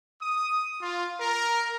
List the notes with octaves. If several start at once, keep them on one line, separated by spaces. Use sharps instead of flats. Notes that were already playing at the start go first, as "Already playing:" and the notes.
D#6
F4
A#4